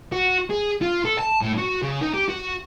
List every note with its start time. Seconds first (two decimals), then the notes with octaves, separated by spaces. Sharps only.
0.12 F#4
0.50 G#4
0.81 F4
1.05 A4
1.18 A5
1.41 A2
1.58 F#4
1.82 C#3
2.01 D#4
2.14 G4
2.29 F#4